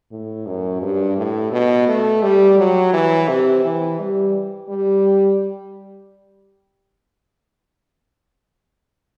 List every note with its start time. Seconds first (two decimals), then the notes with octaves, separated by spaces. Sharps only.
0.11 A2
0.46 F#2
0.82 G2
1.18 A2
1.52 B2
1.88 A3
2.23 G3
2.58 F#3
2.93 E3
3.28 C3
3.64 E3
4.00 G3
4.69 G3